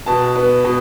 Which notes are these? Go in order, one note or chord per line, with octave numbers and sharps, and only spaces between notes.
B2 A5
B3
B2